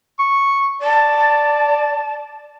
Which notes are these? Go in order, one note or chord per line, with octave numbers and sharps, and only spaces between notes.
C#6
D5 A5